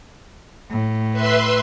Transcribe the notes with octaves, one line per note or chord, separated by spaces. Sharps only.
A2
B4 E5 C6